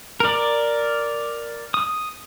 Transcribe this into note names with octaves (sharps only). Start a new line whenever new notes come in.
A#4 D5
D#6